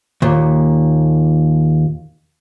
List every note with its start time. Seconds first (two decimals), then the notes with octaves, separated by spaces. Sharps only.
0.22 D#2 A#2